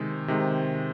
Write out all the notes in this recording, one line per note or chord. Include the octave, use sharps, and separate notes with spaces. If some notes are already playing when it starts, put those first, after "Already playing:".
Already playing: C3 D#3 G#3
C3 D#3 G#3